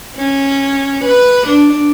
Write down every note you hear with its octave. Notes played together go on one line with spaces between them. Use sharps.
C#4
B4
D4